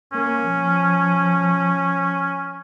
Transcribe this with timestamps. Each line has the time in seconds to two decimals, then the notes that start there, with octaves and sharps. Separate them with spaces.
0.13 A#3 C#4
0.50 F3